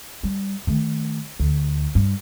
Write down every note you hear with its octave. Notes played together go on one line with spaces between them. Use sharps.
G3
D#3 A3
D2
G2